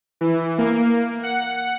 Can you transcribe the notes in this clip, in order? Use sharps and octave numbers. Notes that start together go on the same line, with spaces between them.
E3
A#3
F#5